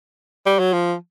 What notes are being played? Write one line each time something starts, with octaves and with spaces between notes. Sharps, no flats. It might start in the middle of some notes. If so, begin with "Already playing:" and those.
G3
F#3
F3